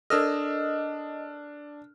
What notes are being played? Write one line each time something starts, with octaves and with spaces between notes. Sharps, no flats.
D4 A4 A#4 D5 D#5 E6 F6